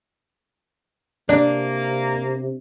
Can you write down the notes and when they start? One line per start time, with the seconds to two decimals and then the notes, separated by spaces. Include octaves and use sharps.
1.29 C3 A#3 D4 D5